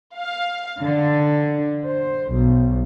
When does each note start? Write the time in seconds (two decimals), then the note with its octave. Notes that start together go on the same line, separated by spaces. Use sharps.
0.18 F5
0.82 D3
1.86 C5
2.34 B1